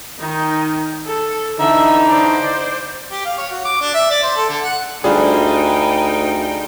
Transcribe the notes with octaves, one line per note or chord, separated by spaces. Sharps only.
D#3 D#4
A4
D3 E3 D#4 E5
C5 D5
G4
F5
C#5
F#4
D6
D4
E5
D5
C5
A4
D3
F#5
D2 G3 D4 D#4 F4 G#4 G5